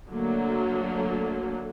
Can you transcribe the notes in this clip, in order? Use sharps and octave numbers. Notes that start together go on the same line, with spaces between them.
D3 F#3 A3 A#3